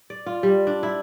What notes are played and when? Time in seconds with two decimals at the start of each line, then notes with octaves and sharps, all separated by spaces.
0.10 D5
0.26 F4
0.43 G3
0.67 D4
0.83 E4